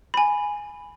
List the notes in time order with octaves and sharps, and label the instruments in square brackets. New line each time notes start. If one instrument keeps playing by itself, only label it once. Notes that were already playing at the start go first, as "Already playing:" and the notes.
[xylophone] G#5 B5